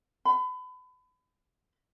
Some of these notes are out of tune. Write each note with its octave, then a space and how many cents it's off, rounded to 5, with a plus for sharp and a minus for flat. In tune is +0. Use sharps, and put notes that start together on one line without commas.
B5 +35